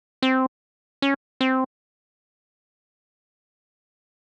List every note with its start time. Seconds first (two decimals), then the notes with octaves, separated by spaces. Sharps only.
0.22 C4
1.02 C#4
1.41 C4